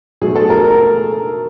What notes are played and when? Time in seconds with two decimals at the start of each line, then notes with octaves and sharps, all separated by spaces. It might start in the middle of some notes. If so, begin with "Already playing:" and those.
0.21 B2 F#3 A3 G#4
0.35 A4
0.50 A#4
0.64 A#4